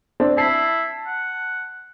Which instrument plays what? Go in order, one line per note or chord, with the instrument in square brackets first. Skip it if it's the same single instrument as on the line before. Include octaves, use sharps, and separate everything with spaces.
[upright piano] C4 D4
[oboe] E4 [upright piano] A5 C7
[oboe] F#5